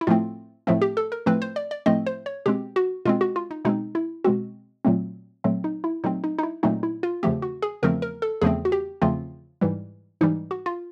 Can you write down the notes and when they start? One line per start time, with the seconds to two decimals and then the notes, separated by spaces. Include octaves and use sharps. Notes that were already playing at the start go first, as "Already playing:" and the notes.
0.01 E4
0.07 A2 F3 A3 C4 F4
0.67 A2 F3 A3 C4
0.82 G4
0.97 A4
1.12 A#4
1.26 A2 F3 A3 C4 B4
1.42 C5
1.56 D5
1.71 D5
1.86 A2 F3 A3 C4 D#5
2.06 C5
2.26 C#5
2.46 B2 G#3 C4 G4
2.76 F#4
3.05 B2 G#3 C4 F4
3.21 F#4
3.36 F4
3.51 D#4
3.65 B2 G#3 C4 D#4
3.95 E4
4.24 B2 G#3 C4 F#4
4.85 A#2 F#3 A3 C4
5.44 A#2 F#3 A3 C4
5.64 D#4
5.84 E4
6.04 A#2 F#3 A3 C4 D#4
6.24 D#4
6.39 D#4
6.43 E4
6.63 A#2 F#3 A3 C4 D#4
6.83 E4
7.03 F4
7.23 E2 C#3 F3 A3 C4 G4
7.42 F#4
7.62 G#4
7.83 E2 C#3 F3 A3 C4 A#4
8.02 A#4
8.22 A4
8.42 E2 C#3 F3 A3 C4 G#4
8.65 F#4
8.72 G4
9.02 E2 C#3 F3 A3 C4 F4
9.61 G#2 E3 G3
10.21 G#2 E3 G3 D#4
10.51 F#4
10.66 F4